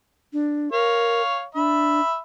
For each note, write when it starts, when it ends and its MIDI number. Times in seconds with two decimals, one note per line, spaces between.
0.33 0.71 62
0.72 1.22 70
0.72 1.44 73
0.72 1.44 77
1.55 2.01 62
1.55 2.20 76
1.55 2.20 83